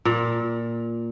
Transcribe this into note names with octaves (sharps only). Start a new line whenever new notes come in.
A#2